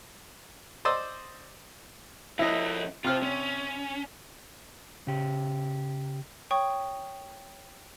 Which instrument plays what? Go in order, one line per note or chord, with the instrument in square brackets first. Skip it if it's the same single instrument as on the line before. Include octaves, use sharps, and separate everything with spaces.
[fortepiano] C5 D5 D#5 C6 D#6 E6
[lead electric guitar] F3 C#4 [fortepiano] E4 D#5
[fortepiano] C3 F6 [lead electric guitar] F4 C5
[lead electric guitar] C#4
[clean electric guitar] C#3 G4
[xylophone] C#5 G5 C#6 D#6